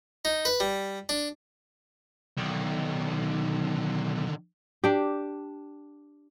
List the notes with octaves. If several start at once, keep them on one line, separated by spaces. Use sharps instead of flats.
D#4
B4
G3
D4
B1 D3 D#3
D4 G4